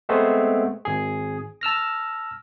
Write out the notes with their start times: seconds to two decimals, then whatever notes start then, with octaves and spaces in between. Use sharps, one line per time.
0.09 G#3 A3 B3 C4
0.85 G#1 G#4
1.61 A5 E6 F6 A#6